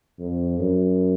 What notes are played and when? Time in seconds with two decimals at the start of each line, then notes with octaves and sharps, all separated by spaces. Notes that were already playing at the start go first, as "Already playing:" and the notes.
0.19 F2
0.60 F#2